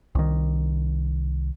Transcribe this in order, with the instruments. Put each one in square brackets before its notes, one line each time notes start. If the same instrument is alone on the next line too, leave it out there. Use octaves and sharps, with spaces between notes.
[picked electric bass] C2 D#3